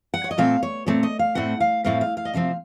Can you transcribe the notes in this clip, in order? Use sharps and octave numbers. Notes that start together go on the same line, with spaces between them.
F#5
C#5
D#5
A#2 A3 C4 F5
C#5
A#2 A3 C4 C#5
D#5
F5
A2 A3 C4 F#5
F5
A2 A3 C4 F5
F5
F5
D#5
C3 F3 C4 F5